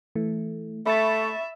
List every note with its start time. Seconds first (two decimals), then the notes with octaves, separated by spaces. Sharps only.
0.15 E3 A3
0.86 A3 E5 B5 C#6 A6